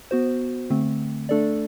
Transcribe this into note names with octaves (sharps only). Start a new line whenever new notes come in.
B3 F#4 C5
D3 A3 C4
A3 D4 A4 D5